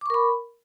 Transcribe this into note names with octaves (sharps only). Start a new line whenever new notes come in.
A#4 B5 C#6 D6